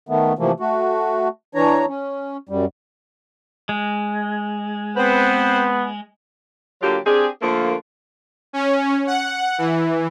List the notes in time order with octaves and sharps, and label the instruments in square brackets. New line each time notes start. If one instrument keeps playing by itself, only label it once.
[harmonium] D#3 A3 B3
C3 E3 F3 A3 A#3
A3 F#4
E3 D4 C#5 A#5
C#4
F#2 G3
[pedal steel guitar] G#3
[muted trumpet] B3 [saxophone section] C4 B4 C5
[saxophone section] D3 F#3 A#3 F4 G4
C4 D4 G4 G#4
D3 F3 A3 A#3
[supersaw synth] C#4
F#5
E3